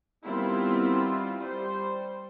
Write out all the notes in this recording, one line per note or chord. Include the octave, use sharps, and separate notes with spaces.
D#3 G3 B3 C4 E4 F4
G3 C5